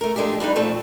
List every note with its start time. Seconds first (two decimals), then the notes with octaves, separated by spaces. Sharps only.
0.01 A3 A#4
0.16 F3 G#3 A3 D4 G4
0.40 G2 D4 D#4 B4
0.55 A#2 F3 A3 C4